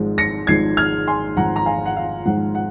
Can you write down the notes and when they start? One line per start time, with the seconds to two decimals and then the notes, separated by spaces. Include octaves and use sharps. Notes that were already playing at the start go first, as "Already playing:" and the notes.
Already playing: G#1 G#2 F3 G#3
0.18 A#6 C#7
0.47 G#1 G#2 F3 G#3 G#6 C7
0.77 F6 G#6
1.08 G#5 C6
1.36 G#1 G#2 F3 G#3 F#5 A#5
1.56 A#5
1.66 F5 G#5
1.86 F#5
1.97 F5
2.25 G#1 G#2 F3 G#3 F#5
2.55 F#5